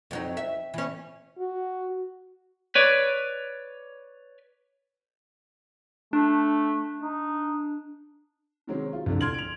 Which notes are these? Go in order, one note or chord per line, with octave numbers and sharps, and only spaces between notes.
F2 F#3 D#4
E5
E3 C#4
F#4
B4 C#5 D5
A3 D4
D#4
C3 D#3 F#3 G#3 C4 C#4
F4
C2 F2 D3
C6 F6 G#6 D7 F#7
D7 F7